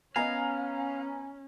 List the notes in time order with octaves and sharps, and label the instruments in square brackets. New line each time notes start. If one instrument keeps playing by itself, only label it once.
[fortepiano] B3 D#5 [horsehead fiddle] C#4 [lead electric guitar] F5 [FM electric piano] G#5 A#5